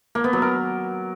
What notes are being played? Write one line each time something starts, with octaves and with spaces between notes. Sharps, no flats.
A#3
B3
F#3
A#4